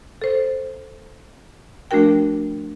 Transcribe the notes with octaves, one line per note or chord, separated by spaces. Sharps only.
A4 C5
F3 A3 D4 F#4 A#4 G5